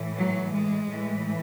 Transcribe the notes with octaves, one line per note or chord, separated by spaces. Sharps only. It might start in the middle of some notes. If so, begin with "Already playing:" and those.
Already playing: A2 E3
F#3
G#3
A2 E3